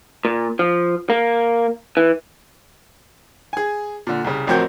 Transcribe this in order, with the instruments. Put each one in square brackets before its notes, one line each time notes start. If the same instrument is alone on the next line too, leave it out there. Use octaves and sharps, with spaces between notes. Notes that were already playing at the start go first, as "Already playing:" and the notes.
[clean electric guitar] A#2
F3
A#3
E3
[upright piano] G#4 G#5
A#2 D3
C2 C#3
A1 F2 C4 F#4 A#4 G6